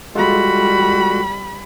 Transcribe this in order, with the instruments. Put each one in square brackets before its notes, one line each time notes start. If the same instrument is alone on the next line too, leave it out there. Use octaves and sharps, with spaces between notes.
[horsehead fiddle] G3 B5 [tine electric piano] G#3 F4 A4 [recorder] F#4